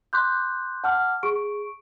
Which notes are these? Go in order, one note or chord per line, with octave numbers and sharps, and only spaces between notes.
C6 D6 F#6 G6
F#5 A5 D6 F6
G#4 C#6 D7